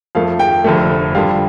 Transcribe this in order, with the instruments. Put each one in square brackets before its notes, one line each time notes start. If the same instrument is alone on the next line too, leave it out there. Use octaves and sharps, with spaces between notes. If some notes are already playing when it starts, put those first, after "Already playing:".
[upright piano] F2 F3 A3 F5
G5
F1 F2 D3 A3
F2 D3 G3 F5